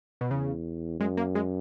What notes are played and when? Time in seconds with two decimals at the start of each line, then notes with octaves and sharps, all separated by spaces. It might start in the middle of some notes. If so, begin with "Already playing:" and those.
0.21 B2
0.31 E2 C#3
1.00 F#2 G#3
1.17 A#3
1.35 G#3